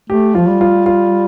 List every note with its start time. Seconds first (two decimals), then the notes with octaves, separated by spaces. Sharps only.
0.10 A3 G4
0.35 F3 F4
0.48 G3
0.61 F4
0.86 F4